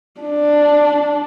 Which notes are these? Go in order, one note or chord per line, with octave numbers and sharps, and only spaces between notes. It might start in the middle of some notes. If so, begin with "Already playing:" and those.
D4